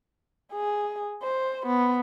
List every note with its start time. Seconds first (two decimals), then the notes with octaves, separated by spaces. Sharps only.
0.53 G#4
1.23 C5
1.66 B3